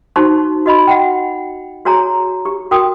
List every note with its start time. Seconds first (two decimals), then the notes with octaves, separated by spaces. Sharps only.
0.16 D#4 F#4 C5 A5 C#6
0.66 F#4 D#5 B5
0.87 F#5 G5
1.85 F#4 G#4 C#5 G#5 A#5
2.45 G4
2.71 F#4 A#4 G5 D#6